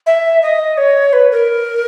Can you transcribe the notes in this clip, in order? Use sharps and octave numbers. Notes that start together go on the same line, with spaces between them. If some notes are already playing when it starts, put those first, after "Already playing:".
E5
D#5
C#5
B4
A#4